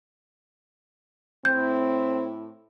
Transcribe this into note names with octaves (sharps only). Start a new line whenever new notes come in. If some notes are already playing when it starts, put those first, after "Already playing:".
A2 C4 E4 G6